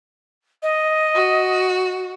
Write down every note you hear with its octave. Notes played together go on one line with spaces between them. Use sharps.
D#5
F#4